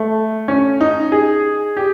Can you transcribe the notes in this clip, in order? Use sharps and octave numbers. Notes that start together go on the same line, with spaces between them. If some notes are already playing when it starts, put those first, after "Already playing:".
Already playing: A3
C#4
D#4
G#4
G4